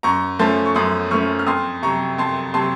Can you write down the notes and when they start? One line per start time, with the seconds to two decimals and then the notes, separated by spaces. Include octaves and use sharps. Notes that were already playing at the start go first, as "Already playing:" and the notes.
0.03 F#2 A#5 C#6
0.39 F3 A3 C#4 A5 C6
0.65 C#6
0.75 F#2 C6 D#6
1.11 F3 A3 C#4 C#6 F6
1.39 F6
1.47 F2 C6 D#6
1.83 C3 F#3 A#5 C#6
2.18 F2 A5 C6
2.54 C3 F#3 A5 C6